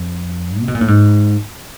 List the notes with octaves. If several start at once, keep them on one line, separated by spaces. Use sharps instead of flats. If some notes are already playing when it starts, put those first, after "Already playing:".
Already playing: F2
C3
B2
A#2
A2
G#2